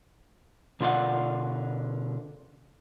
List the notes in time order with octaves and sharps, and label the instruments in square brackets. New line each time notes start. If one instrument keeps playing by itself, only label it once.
[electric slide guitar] B2 D3 F4 D5 F5 F#5